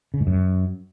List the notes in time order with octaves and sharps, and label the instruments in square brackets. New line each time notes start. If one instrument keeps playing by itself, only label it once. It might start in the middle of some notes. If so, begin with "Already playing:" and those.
[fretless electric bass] C#3
G#2
F#2